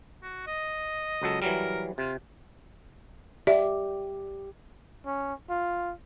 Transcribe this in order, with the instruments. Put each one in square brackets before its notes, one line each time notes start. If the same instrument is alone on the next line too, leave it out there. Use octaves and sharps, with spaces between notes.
[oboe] F#4
D#5
[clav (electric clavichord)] C#2 F#3 A4
[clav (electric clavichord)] E3 F#3 G3 [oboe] A#4
[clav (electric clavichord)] C3 [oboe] F4
[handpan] G4 [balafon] D5 E5
[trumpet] C#4
F4